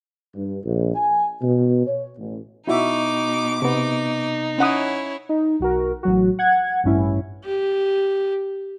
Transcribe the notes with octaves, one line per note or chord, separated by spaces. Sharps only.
G2
A#1
G#5
B2
C#5
A1
B2 D#4 E4 F#4 E5 D6
C3 B3 D#4
C#4 E4 C#5 F#5 D#6
D#4
B1 F#4 A#4
A1 F#3 F#4
F#5 G#6
A1 G2 C#4 E4
G4